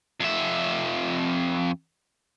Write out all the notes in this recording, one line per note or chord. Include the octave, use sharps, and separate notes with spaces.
F2 E5